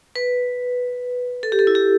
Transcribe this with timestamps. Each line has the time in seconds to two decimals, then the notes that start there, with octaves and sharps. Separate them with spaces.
0.16 B4
1.43 A4
1.52 G4
1.59 A4
1.67 E4
1.75 G4